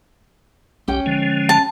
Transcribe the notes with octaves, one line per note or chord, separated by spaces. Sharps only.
B1 C#4 G4 C#5 G5
D3 F3 G#3
A5